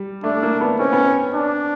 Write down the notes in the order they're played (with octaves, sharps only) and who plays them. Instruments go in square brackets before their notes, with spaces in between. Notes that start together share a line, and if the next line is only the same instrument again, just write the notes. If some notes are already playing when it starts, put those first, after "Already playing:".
Already playing: [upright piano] G3
[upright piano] A3 [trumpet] D4
[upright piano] A#3
B3
[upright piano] C4 [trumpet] C#4
[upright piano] B3
C4
[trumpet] D4